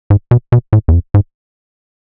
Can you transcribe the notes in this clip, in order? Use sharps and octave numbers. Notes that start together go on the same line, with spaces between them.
G#2
B2
B2
A2
E2
F2
G#2